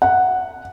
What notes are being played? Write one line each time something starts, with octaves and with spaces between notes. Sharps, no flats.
F#5